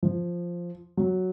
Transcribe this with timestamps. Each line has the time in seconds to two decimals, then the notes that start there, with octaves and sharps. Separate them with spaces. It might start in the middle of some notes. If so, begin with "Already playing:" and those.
0.03 F3
0.97 F#3